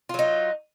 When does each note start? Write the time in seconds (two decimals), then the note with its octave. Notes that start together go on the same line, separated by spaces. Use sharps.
0.09 F4
0.14 F#3
0.19 D#4